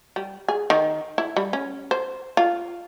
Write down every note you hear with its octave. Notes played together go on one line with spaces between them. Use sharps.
G3
G#4
D#3
E4
G3
C#4
C5
F4